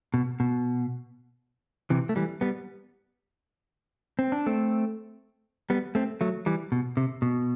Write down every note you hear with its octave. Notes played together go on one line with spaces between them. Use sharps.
B2
B2
C3 E3
A3
E3 G3
G3 B3
C4
D4
A3 C4
G3 B3
A3 C4
F#3 A3
E3 G3
B2
C3
B2